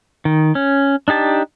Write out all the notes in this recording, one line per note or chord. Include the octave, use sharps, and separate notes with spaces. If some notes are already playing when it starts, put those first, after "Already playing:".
D#3
C#4
D4 D#4 G4 A5